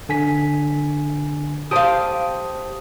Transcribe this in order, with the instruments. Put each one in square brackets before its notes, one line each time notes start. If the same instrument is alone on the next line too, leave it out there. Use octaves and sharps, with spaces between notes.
[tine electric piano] D3 G#5 B6
[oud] G4 F5 [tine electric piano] C5 A5 D#6